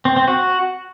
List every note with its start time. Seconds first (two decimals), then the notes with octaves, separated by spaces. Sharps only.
0.05 C4
0.16 C4
0.28 F#4